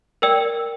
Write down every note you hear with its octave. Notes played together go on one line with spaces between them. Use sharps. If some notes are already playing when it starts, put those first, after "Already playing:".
A#4 D5 G5 E6